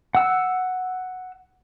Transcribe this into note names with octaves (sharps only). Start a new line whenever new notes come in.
F#5 E6